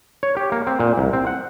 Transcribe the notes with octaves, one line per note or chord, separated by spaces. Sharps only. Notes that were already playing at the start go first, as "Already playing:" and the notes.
C#5
G4
A#3
C4
A#2
C2
C4
F#5